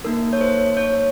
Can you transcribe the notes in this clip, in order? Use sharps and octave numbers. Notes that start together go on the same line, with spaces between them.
A#3 D#4 A4 A#4
C#5
C5
C#5